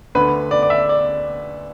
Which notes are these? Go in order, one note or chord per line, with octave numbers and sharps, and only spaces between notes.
D2 D3 B4
D5
D5
E5
D5